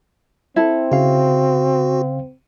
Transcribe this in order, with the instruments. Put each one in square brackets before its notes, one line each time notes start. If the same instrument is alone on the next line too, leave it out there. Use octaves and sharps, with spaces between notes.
[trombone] C4 [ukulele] E4 A4
[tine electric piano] C#3 F5 [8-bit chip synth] F#4